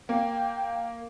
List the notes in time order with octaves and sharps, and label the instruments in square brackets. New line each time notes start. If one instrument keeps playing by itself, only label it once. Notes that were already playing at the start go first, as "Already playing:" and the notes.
[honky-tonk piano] A#3 [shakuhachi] G5